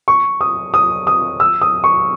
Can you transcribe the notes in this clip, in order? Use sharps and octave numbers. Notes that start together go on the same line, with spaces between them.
C#6
D#6
D#6
D#6
E6
D#6
C#6